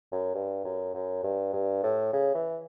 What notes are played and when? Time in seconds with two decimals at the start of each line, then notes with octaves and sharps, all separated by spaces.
0.12 F#2
0.34 G2
0.64 F#2
0.94 F#2
1.23 G2
1.53 G2
1.83 A2
2.13 C#3
2.34 E3